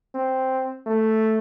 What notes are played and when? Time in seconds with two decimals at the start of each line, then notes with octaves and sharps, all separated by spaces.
0.14 C4
0.86 A3